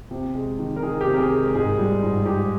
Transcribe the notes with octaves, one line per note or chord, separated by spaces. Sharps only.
C3
G#3
D#3
A#4
D#3 G#4
G4
C3
A#4
G#4
G#3
A#4
G#2 G#4
G3
G#2
G#2 G4